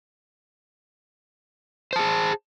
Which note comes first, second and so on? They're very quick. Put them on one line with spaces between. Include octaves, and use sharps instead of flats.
C5 A5 G#4